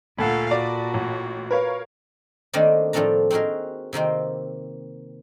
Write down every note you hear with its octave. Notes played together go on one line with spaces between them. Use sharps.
D2 A#2 A4 F5 F#5 A5 B5
F#4 D5
A1
A#4 B4 C#5 F5
D#3 A3 A#3 C4 D4 D#4
A2 F3 A3 C4 D4 A#5
C4 D#4 F#4 G#4 A#4
C3 D#3 A#3 C4